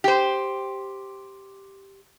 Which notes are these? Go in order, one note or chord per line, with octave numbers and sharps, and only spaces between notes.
G4 C5